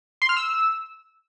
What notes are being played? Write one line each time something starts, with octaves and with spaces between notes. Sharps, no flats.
C6
F6
E6